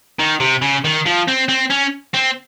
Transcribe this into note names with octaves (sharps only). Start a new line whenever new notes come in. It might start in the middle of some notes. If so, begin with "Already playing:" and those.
D#3
C3
C#3
D#3
F3
C4
C4
C#4
C4